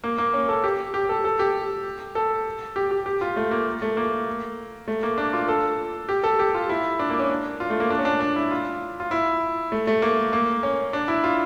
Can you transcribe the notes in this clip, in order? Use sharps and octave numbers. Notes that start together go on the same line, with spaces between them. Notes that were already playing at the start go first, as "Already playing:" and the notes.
A#3
A#3
C#4
A4
G4
G4
A4
A4
G4
A4
G4
G4
G4
F4
A3
A#3
A3
A#3
A3
A#3
D4
F4
A4
G4
A4
G4
F4
E4
D4
A#3
C#4
D4
F4
A3
A#3
D4
C#4
D4
D4
E4
F4
F4
E4
A3
A3
A#3
A#3
C#4
D4
E4
F4